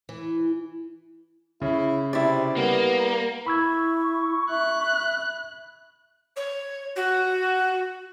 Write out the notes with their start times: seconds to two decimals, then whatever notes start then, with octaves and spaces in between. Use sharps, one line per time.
0.09 E3
1.62 C#3 E4
2.13 C3 E4 D5
2.57 G3 A#3 B3
3.46 E4 B5 C#6 E6 G#6
4.50 E5 F#6
6.36 C#5
6.95 F#4